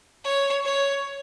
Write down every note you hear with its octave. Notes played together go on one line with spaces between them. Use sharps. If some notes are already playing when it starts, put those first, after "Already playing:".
C#5
C#5